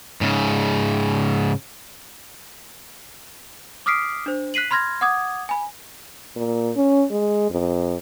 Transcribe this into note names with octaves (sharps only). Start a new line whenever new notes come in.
G#2 C#3
D6 D#6 F6 B6 C7 D7
D4 C5
F#6 B6 C7 D#7 F#7
B5 C6 F6 G#6 A#6
F#5 D6 D#6 G#6
G#5 B5
A#2
C#4
G#3
F2